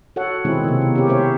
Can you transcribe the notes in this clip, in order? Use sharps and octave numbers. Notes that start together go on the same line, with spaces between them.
F#4 A4 C#5 F#5
B2 D#3 G#3 C4 E4 G#4
C3 A#3
B3
C#4 G4
A3 C4 C#4 C5 C#5 E5